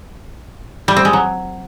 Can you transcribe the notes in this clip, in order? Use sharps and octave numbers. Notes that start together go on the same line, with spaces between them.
G3
C4
G#3
F#3